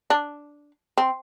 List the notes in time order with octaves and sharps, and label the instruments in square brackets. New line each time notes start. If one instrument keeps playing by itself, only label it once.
[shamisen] D4
C4